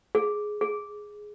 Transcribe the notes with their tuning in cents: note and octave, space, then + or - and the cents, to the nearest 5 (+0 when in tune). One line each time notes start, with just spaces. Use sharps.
G#4 +10
G#4 +5